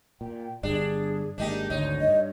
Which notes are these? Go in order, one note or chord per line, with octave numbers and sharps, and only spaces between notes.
A#2 G5
G1 G2 G3 D4 G#4
G#1 G#3 A#3 D4 D#4 G4
G#1 D2 D#4 C#5
G2 D#5